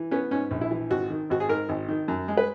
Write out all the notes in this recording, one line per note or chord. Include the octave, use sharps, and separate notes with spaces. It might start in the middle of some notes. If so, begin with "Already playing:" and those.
Already playing: E3
B3 C#4
G#2 C#4
A#1
E4
E3
G#1 F#4
D#3
G#1 F#4
G#4
G#2 A#4
G#1
D#3
F#2
G#3
B4